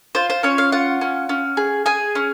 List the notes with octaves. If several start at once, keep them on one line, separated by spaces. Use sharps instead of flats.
F4 C5
C5
C#4 C#5
F5
F4 F#5
C#4
C#4
G#4
G#4 G#5
C#4